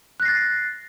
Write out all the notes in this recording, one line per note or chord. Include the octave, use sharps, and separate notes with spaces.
F#6 A6 A#6 C7